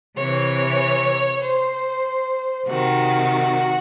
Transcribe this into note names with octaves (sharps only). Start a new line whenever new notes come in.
C3 E3 C#5
C5
C3 D#3 F#4